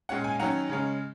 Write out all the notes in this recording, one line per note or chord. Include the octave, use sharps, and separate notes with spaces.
A#2 G#3 C#4 F#5
G#5
D#3 F#3 C#4 F#5 A#5
C#3 G#3 C#4